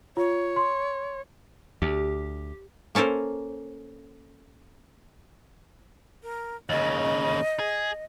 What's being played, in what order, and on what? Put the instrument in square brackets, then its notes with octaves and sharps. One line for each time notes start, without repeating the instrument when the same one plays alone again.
[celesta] F4 [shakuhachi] C#5
[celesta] C6
[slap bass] D2 [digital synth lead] G4
[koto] A#3 C#4 A4 A#4 C5
[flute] A#4
[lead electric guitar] D#2 C#3 [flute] D#5
[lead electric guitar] G#4